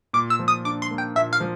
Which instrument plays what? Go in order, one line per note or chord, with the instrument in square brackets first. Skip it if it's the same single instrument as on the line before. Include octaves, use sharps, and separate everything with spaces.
[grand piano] A#2 [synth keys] D6
[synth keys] E6
[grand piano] F3
[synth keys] D#6
[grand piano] D4 [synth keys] D6
[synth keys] C6
[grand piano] A#3
[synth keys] G5
[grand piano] A#2 [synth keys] E5
[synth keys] F5
[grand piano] F3